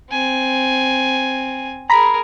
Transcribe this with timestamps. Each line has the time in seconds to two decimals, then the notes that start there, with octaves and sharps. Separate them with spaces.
0.11 C4 G#5
1.90 G#4 A#4 A#5 B5